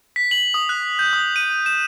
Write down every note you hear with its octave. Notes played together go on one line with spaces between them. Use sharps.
B6
F#7
D#6
F#6
G6
D#6
D#7
E7